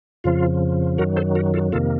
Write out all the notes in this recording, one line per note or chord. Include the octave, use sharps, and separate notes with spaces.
F2 C#3 F3 F4
F#2 D#3 F#3 F#4 A#4
A4 C5
F#4 A#4
F4 A4
F2 C3 D#3 A#3 F4 A4